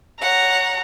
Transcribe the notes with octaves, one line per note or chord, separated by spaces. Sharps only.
C#5 F#5 A#5